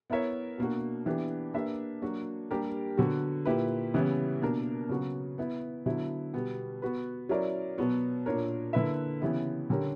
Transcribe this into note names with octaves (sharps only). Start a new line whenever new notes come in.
B3 E4 A#4 C#5 E5
B2 A#3 D4 F#4
E3 B3 D4 G4
A#3 D4 G4 B4 E5
F#3 A#3 D4 F#4
G3 A#3 D4 G4 A#4
D3 F#3 B3 F#4
A#2 A#3 E4 G4 B4
C#3 E3 G3 B3 E4
B2 A#3 D4 A#4
C#3 F#3 B3 F#4
B3 E4 B4
D3 F#3 B3 E4
B2 G3 B3
B3 F#4 B4
F#3 C#4 E4 A#4 D5
B2 F#3 B3 F#4
A#2 A#3 D4 A#4 C#5
D3 A#3 E4 B4 E5
C#3 E3 B3 E4 G4
D3 G3 C#4 G4 A#4